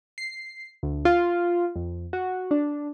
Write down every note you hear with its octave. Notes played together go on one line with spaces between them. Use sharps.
C7
D2
F4
F2
F#4
D4